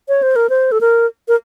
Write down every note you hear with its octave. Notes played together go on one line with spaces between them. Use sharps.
C#5
C5
A#4
C5
A4
A#4
A#4